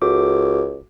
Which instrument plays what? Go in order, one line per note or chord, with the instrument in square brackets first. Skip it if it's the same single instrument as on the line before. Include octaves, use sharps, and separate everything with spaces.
[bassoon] C#2 [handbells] F#4 A4 D6